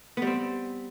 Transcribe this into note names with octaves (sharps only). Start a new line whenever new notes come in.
G3 B3 C4